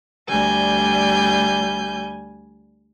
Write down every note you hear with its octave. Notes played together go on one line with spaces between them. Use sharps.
D2 G3 G#5 G6